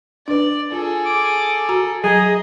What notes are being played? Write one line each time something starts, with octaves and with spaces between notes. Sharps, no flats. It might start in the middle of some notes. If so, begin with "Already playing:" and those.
D4 B4 D5
F4 G#4 A4
D6
F#4 A#5
F#3 G#4 D#5 A#5